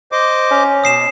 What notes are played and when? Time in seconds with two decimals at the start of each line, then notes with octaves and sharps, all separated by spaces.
0.12 C5 D#5 D6
0.51 C#4
0.84 B2 D#6 C7 E7